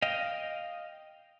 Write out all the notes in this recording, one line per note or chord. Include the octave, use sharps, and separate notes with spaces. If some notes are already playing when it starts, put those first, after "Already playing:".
D#5 F5 G5